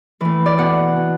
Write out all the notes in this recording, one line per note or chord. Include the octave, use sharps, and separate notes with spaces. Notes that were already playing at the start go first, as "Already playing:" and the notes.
A2 E3 B4
D5
B2 F#5
B2